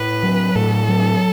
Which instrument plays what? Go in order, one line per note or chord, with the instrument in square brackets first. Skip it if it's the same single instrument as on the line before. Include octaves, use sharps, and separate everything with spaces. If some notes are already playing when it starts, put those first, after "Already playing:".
Already playing: [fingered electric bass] A2 [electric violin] B4
[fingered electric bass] F#3
[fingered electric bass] A2 [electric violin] A4
[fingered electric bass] F#3